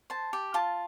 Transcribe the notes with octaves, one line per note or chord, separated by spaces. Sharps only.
C5 A5
G4
F4 A5